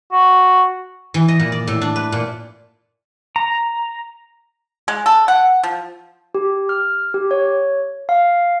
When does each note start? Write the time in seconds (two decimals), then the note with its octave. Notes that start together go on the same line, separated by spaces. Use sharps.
0.12 F#4
1.14 E3
1.28 D#5
1.39 A#2
1.52 D5
1.67 A2
1.82 D4
1.96 B4
2.12 A#2
3.36 A#5
4.88 G#3
5.06 A4
5.28 F#5
5.63 F3
6.35 G4
6.69 F6
7.14 G4
7.31 C#5
8.09 F5